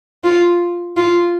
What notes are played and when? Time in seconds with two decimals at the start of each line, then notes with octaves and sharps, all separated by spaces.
0.24 F4
0.97 F4